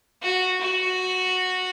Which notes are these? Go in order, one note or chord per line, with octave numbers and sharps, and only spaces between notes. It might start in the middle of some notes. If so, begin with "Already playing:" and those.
F#4
F#4